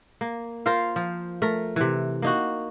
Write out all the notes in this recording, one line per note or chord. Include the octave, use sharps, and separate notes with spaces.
A#3
F4 A#4 C5 F5
F3
A3 A#4
C3 E3
A#3 D#4 F#4